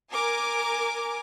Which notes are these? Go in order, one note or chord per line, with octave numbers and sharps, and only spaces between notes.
A#4 G#5 D6